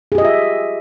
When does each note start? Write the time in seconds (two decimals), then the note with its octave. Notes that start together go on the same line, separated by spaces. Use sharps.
0.12 G#4
0.15 G4
0.18 D#5
0.21 F4
0.25 E5